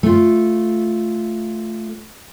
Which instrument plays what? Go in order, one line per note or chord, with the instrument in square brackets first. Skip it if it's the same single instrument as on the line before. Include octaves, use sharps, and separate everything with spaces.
[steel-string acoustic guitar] A3 F4